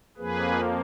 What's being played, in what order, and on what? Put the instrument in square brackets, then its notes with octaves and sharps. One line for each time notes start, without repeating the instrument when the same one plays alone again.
[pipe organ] F2 F3 A#3 G#4 B4